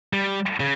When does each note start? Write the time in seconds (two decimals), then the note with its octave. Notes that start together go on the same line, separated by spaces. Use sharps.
0.13 G3
0.60 C#3